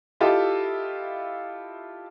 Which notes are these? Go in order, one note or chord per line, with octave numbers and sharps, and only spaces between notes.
E4 F4 G4 A4 D#5 E5